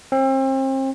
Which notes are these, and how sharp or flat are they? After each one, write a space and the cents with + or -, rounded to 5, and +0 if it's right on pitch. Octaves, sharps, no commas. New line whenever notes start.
C4 +35